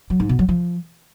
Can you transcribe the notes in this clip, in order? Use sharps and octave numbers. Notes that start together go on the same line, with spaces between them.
F#3
G#2
B2
F#3
F3